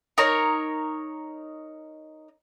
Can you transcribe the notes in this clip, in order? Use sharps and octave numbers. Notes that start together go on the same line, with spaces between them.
D#4 A#4 C#5 A#5